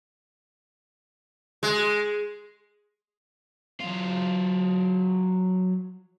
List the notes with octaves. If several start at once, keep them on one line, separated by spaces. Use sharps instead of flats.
G#3
F#3 F4